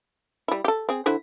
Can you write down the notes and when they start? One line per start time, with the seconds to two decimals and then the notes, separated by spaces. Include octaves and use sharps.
0.48 G3 E4
0.64 G4 A4
0.89 C4 G#4
1.06 D3 E4 C5